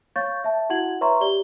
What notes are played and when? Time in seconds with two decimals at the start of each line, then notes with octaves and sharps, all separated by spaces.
0.16 C#5 F5 C#6 G6 A6
0.44 E5 A5
0.70 E4 F#4 F#5 G#6 F#7
1.01 B4 C#5 E5 A#5 C6 C#6
1.21 G4 D5 G7